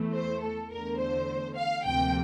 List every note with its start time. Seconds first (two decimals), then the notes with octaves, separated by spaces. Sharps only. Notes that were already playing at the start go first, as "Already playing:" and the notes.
Already playing: E2 E3 A3
0.14 C5
0.41 A4
0.71 E2 D3 A3 A#4
0.99 C5
1.56 F5
1.85 D2 C3 F3 A#3 G5